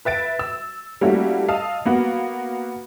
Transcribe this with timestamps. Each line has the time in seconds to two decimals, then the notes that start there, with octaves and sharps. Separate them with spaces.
0.05 B4 E5 A6 D7
0.39 E6
1.01 G3 A3 A#3 C#4 E4 F#4
1.48 D#5 F5 A5 D#6 E6
1.85 A#3 B3 F#4